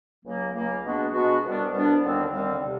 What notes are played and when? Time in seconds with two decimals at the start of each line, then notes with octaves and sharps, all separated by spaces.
0.24 C#2 C#3 F#3 A#3
0.54 C#2 C#3 F#3 A#3
0.83 B2 G#3 B3 D4 F#4
1.12 B2 G#3 B3 D4 F#4
1.43 C2 B2 G3 B3 D4
1.72 C2 B2 G3 B3 D4
2.02 D#2 D3 G3 C4
2.31 D#2 D3 G3 C4
2.62 C3